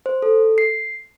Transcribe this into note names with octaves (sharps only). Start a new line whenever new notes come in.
C5
A4
C7